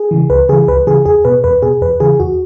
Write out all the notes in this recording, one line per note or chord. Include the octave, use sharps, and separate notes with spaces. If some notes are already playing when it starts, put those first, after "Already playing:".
Already playing: G#4
C#3 E3
C#2 B4
C#3 E3 G#4
C#2 B4
C#3 E3 G#4
E2 G#4
B2 B4
E2 B4
B2 G#4
E2 B4
C#3 E3 G#4
E2 F#4